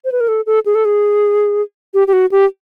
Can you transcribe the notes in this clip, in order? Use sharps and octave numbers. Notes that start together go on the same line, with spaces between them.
C5
B4
A#4
A4
A4
G#4
A4
G#4
G4
G4
F#4
G4